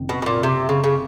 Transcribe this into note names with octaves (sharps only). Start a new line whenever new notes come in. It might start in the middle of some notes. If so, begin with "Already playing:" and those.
Already playing: F#1 C3 D#3
B2
B2
A#2
C3
C#3
C#3